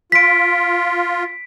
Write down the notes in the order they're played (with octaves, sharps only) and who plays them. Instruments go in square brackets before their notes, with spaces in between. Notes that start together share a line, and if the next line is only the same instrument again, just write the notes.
[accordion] F4 [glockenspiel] B6 D7